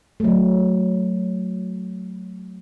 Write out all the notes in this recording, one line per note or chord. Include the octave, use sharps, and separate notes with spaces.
F#3 A3